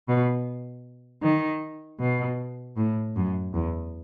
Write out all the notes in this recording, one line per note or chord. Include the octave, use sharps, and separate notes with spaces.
B2
D#3
B2
A2
F#2
E2